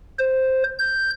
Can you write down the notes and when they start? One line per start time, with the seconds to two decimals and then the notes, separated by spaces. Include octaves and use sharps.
0.19 C5
0.79 G6